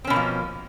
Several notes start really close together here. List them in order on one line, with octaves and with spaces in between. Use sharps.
C4 C#4 B2 A#3 F3